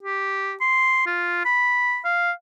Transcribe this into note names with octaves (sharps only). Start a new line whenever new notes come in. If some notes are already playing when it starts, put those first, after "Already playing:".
G4
C6
F4
B5
F5